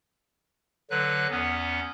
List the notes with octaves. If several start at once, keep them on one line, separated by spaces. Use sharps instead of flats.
D3 F#3 B4 F#6
E2 B3 C#4